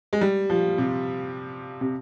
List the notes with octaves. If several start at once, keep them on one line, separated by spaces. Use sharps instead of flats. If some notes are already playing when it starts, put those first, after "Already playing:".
G#3
G3
F3
C3
C3